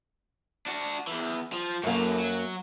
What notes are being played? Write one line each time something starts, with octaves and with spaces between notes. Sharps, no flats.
D4 F#4
E2 E3
F3
F#2 A2 F#3 A#3
F#3